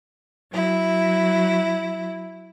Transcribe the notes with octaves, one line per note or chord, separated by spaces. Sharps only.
F#3 E4